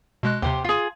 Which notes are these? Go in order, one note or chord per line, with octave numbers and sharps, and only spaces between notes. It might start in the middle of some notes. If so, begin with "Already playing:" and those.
B2 G#3 F#6
D#2 C3 G4 C5
F4 G#4